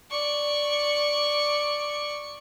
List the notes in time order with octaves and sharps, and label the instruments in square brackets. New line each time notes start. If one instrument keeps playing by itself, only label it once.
[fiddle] D5 C#6